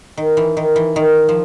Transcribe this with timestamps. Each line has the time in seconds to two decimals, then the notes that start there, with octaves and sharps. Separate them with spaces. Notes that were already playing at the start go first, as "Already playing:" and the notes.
0.17 D#3
0.37 E3
0.57 D#3
0.76 E3
0.96 D#3
1.29 F3